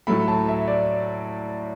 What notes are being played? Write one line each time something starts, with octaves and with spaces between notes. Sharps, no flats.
A2 F#3 A3 B5
A5
E5
D5